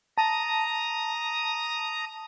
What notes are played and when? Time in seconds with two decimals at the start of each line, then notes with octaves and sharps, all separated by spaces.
0.18 A5 A#5 D#6